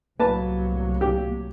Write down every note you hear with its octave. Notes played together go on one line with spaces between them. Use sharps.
C2 A2 F#3 A#3 B4 A5
G4